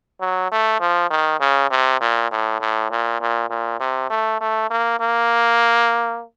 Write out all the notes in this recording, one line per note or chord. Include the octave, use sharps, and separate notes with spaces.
F#3
A3
F3
D#3
C#3
C3
A#2
A2
A2
A#2
A#2
A#2
C3
A3
A3
A#3
A#3